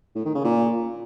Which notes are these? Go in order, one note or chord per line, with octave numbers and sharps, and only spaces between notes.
A2
D#3
C#3
A#2